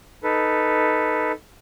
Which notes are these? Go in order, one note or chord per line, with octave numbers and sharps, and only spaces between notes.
D#4 A4 B4